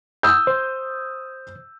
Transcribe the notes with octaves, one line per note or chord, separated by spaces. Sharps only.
D#6 E6 G6
C5